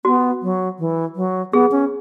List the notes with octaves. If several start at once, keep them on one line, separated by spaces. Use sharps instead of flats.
B3 F#4
F#3
E3
F#3
B3 G#4
C#4